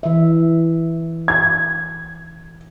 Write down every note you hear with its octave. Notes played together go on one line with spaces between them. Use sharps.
E3 E5
G#6